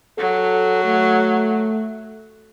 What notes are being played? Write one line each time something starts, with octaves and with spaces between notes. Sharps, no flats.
F#3 A4
A3